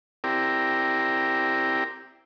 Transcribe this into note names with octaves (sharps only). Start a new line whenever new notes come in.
C4 E4 G4 A#4 D5